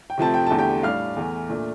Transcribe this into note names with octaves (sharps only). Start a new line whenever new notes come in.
G5
C3 F3 A3 C4 A5
G5
E2 D3 A3 A5
G4 G5
A2 G3 D4 F5 F6
E2 E3 A3
A#2 A3 D4